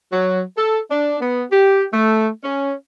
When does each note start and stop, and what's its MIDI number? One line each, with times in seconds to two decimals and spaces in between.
0.12 0.40 54
0.58 0.80 69
0.91 1.20 62
1.21 1.44 59
1.52 1.84 67
1.93 2.27 57
2.43 2.73 61